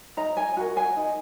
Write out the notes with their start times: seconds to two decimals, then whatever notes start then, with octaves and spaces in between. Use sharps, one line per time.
0.17 D#4 A#5
0.37 G#5
0.56 F#4 A#4 F#5
0.77 G#5
0.97 D#4